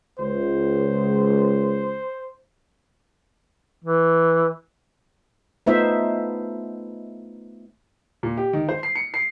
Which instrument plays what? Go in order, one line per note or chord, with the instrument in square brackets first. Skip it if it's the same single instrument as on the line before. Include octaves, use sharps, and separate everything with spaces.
[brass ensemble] C#2 [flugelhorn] C5
[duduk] E3
[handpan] A3 B3 D#4 F4 C5 E5
[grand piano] A#2
G4
D#3
C5
C7
C#7
C7